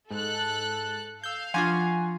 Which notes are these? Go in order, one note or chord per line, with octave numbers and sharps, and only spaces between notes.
G#2 A4 F#6
F5 E6 G6
F3 D4 F4 F#5 G#5 C#6